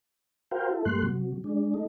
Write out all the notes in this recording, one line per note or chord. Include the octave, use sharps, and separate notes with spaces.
F#4 A#4 C5 F5 G5
E4 A4
G2 G3 A3 A#3 C6 F#6
C3 F#3
G#3 D4
A3 D#4